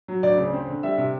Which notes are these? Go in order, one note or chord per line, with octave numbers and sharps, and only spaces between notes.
F#3
D2 D5
C#3
C4
D3
G3 E5
C3